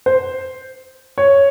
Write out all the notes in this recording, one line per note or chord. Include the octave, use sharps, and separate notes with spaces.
C5
C#5